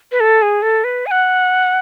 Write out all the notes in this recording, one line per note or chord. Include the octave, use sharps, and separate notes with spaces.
B4
A4
G#4
A4
B4
G#5
F#5